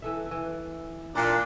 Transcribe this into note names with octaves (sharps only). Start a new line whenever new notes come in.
E3 A4 E5
E3
A#2 D4